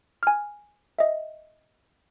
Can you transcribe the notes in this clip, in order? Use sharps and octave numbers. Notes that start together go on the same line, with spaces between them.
G#5 F6
D#5 E5